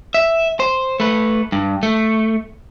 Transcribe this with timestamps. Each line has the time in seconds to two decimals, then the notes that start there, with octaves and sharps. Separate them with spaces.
0.14 E5
0.60 C5
1.00 A3 B4
1.52 G2
1.83 A3